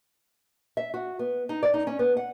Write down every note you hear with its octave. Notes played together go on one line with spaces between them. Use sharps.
E5
F#4
B3
D#4
D5
D#4
C#4
B3
F#5